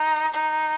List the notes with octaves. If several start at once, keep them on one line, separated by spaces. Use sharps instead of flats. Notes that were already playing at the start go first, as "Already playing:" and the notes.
Already playing: D#4
D#4